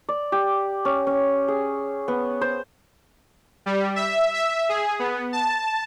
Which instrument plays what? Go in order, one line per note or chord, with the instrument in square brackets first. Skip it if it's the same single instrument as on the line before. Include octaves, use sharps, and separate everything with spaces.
[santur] D5
G4
C#4
C#4
G#4
B3
C5
[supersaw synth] G3
E5
E5
G#4
B3
A5